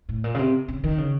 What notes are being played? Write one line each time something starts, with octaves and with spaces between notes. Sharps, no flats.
A2
A#2
C#3
C3
C#3
D#3
C#3